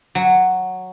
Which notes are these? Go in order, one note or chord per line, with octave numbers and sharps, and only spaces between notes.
F#3